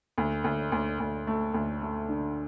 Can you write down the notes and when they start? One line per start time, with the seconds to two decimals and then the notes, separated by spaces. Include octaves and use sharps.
0.18 D2
0.44 D2
0.72 D2
1.00 D2
1.27 A3
1.54 D2
1.81 A3
2.09 D3